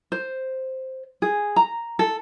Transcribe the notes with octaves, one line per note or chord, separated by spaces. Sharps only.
C5
G#4
A#5
A4